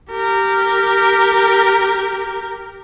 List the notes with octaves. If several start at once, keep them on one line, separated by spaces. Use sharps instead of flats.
G4 A#4